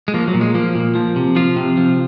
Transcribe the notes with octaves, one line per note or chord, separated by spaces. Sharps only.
G#3
F3 A#3
F#3
A#2
G#3
F3 A#3
A#2
F3
C3
F3 F4
C3
F3